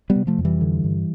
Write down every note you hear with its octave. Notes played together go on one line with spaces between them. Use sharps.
G3 B3
C3
F3 A3
F2
E3 G3
D3
G2